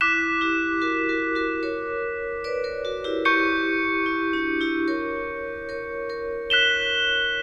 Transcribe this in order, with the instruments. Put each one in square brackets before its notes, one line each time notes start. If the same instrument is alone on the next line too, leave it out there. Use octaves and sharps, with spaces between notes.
[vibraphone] E4 [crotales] D6 F#6 B6 E7
[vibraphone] E4 G4
F#4 A#4
F#4 A#4
F#4 A#4
A#4 C#5
B4 D5
A#4 C#5
F#4 A#4
E4 G4
[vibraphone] E4 G4 [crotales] C#6 G6 C#7
[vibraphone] E4
D4 F#4
E4 G4
A#4 C#5
A#4 C#5
A#4 C#5
[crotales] F#6 B6 E7 G7